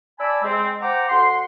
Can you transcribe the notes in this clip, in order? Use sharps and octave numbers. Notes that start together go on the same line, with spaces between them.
D5 G#5 A5 B5 E6
G#3 C4
C5 F#5 G5 A#5 D6
D2 F#5 C6